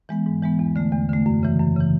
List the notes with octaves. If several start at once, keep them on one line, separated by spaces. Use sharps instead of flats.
E3 G#3 B3
G#2
E3 G#3 B3
E2
D3 A3
E2
D3 A3
F#2
C#3 E3
F#2
C#3 E3